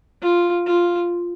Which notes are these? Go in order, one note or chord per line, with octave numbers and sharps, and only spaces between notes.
F4
F4